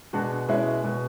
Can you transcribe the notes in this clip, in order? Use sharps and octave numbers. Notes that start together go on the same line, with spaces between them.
B2 G#3 D4 F#4
B2 G#3 C#4 E4
B2 G#3